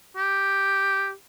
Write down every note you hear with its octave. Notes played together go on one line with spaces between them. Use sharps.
G4